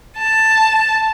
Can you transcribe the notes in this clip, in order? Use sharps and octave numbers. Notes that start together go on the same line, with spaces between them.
A5